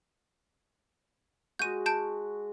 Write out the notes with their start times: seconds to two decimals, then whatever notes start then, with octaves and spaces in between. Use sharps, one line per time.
1.59 G#3 F#4 G6 D#7
1.86 A5 G6 D7